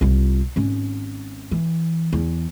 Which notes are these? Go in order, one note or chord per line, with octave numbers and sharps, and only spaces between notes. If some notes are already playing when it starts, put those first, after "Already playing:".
C2 F4
G#1 C#4
E3
E2